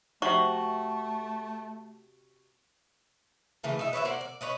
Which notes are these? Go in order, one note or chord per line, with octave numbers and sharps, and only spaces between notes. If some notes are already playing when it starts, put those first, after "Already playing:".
C3 A3 F#4 C#6
C#3 E3 A3 A#3
D#4 E5
B4 C#5 D#5 E5
A#3 C5 D5 F#5
D5
C#4 B4 D#5